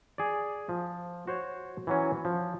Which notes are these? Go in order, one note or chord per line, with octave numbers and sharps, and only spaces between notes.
G#4 D5
F3
F#4 C5 C#5
E3 F#3 C#4
F3